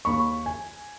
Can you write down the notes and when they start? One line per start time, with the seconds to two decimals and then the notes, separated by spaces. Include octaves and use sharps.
0.05 D#2 B5 C#6
0.46 G#5